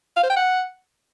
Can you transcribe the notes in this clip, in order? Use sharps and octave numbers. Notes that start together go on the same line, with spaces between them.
F5
C5
G5
F#5